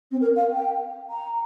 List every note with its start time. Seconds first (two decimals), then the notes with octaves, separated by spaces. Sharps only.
0.11 C4
0.21 A#4
0.36 F5
0.51 G5
1.10 A#5